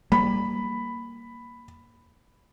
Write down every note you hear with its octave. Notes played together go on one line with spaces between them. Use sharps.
G3 A#3 B5